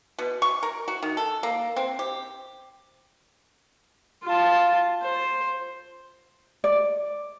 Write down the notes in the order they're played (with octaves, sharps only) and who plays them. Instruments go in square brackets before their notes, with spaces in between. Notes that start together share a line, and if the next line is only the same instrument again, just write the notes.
[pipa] B2
C#6
A#4
F#4
D#3
A4
A#3
C4
G4
[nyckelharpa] F4 A5
C5
[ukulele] D5